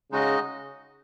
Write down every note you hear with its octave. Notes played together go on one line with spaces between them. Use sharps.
C#3 G#3 D#4 F#4 D#5